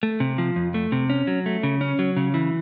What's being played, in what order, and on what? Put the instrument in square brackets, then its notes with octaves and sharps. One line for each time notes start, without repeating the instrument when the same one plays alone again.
[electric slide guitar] A3
C3
F3
F2
A3
C3
C#4
F#3
A3
C#3
C#4
F#3
C#3
E3